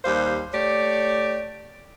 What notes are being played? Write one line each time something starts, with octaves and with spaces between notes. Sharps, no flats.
D#2 G3 C5 F5
A3 G4 C#5 D5